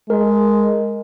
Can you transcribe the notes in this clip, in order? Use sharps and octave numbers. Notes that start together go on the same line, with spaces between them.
G#3 A#4